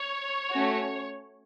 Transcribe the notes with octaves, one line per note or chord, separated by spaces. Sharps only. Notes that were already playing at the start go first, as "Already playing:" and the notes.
Already playing: C#5
A3 C#4 F#4